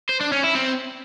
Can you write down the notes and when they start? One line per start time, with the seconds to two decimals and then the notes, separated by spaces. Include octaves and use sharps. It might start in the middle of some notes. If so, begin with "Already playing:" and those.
0.09 C5
0.21 D4
0.32 C#4
0.43 E4
0.55 C4